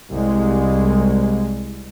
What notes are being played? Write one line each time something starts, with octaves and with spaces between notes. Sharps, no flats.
C2 G#3